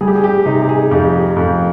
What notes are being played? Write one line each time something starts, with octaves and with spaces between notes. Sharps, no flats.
G3 G#4
G4
G#4
G4
C3 D#4
G4
G#4
F2 G4
F2